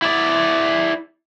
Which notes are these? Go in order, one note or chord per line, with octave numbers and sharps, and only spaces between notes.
E4 D5